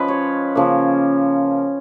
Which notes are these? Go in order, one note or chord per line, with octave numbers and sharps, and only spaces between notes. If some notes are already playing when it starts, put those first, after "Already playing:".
Already playing: F3 G#3 C#4 B4 D#5
C#5
C#3 F3 A#3